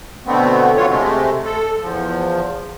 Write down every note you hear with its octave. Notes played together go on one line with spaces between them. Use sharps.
B2 D3 A3 B3 C4
F#3 B3 F4 C#5
C3 G#3 A3
A4
E2 F3